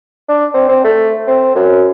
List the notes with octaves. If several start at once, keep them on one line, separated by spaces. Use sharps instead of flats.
D4
C4
C4
A3
C4
F#2